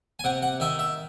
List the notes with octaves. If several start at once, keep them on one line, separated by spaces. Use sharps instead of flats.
G#5
C3 F#5
F#5
D#3 E5
E5